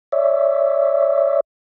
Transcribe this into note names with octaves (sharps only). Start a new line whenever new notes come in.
C#5 D5 E5